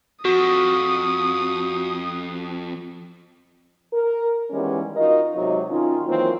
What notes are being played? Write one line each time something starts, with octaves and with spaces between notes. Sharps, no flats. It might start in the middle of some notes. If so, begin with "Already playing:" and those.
F2 F#4 D#6
A#4
D#3 E3 G3 G#3 B3 C#4
D#4 F4 F#4 A#4 D#5
G#2 C3 F#3 D#4
D#3 C#4 D#4 F4
D#3 E3 F#3 A#3 C4 F4